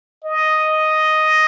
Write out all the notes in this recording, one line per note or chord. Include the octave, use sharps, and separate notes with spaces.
D#5